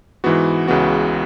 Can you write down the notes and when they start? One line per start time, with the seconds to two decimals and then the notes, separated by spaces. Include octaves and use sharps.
0.24 G#2 E3 B3 F#4
0.68 C#2 C#3 E3 B3 F#4